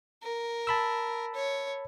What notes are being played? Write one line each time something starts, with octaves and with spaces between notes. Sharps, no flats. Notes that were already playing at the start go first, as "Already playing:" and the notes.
A#4
A5 B5 E6
C#5